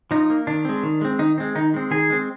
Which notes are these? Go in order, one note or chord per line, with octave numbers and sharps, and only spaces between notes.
F3 D#4
A#3
D#3 D4
G#3 C4
D#3
G#3 C4
D#3 D#4
G#3 C4
D#3 D#4
G#3 C4
D#3 G#4
G#3 C4